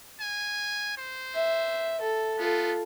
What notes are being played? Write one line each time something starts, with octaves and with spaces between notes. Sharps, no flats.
G#5
C5
E5
A4
B3 F4 A4